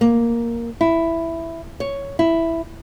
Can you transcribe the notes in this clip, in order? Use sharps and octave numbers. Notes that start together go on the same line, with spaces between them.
A#3
E4
C#5
E4